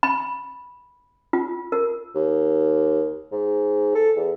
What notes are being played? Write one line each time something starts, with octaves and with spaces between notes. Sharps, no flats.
B5
F4
A#4
D#2
G#2
A4
E2